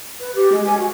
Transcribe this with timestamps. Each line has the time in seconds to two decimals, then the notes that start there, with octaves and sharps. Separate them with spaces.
0.20 B4
0.35 G4
0.52 G#3
0.66 G#5
0.78 F#4